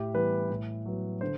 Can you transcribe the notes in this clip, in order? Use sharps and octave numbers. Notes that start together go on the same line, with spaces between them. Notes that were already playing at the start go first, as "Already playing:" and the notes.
Already playing: A2 G4
E3 G3 B3 B4
A2
F#3 B3
D3 C5